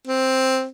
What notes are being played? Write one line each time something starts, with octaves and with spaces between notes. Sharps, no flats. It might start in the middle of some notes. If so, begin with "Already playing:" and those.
C4